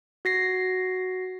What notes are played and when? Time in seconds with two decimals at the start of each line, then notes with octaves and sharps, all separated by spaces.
0.25 F#4 A#6 C7